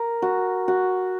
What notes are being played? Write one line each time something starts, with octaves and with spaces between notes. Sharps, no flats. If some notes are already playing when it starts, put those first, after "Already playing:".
Already playing: A#4
F#4
F#4